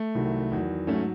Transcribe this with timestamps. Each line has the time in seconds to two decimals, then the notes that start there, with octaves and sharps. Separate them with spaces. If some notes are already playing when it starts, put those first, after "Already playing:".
Already playing: A3
0.15 C2 C3 D#3 F#3
0.52 E2 D#3 F#3
0.87 G#2 F#3 A3 C#4